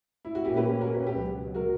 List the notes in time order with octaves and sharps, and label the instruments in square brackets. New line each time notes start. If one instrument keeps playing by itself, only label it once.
[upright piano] E4
F#4
[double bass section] A#2 A#3 C#4 [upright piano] E4 G4
[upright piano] G4 B4
G4 B4
F#4 A#4
G4 B4
G4 B4
[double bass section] C#2 B2 F#3
[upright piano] F#4 A#4